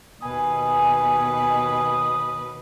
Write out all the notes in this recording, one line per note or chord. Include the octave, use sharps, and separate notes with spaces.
D#2 B2 B4 G#5 D#6